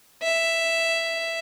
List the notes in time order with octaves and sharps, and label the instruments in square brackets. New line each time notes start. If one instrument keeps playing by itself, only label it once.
[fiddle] E5